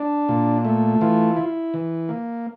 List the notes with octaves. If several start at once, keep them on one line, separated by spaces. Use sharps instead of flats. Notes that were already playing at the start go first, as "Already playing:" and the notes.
Already playing: D4
A#2
A3
E3 F4
E4
E3
A#3